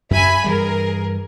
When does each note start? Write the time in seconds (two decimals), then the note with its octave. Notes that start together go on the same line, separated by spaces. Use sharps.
0.11 F#2 E5 G#5 B5
0.44 G2 E3 G3 G#4 A#4